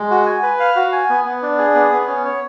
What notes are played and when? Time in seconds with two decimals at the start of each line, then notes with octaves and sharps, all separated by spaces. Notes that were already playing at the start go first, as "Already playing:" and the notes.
Already playing: G#3
0.10 F#4
0.26 G#5
0.42 B4
0.60 F5
0.75 F#4
0.92 G#5
1.09 B3
1.25 B3
1.42 D4
1.58 G#4
1.74 B3
1.92 B3
2.07 C#4
2.25 C#5